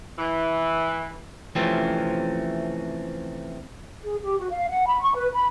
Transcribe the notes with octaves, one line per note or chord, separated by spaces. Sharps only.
E3
C3 E3 F3 A3 C4 C#4
G#4
G4
F#4
F5
F#5
B5
C#6
B4
B5